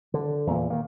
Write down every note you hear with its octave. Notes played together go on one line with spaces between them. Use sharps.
D3
E2 A#2
D#3 A#3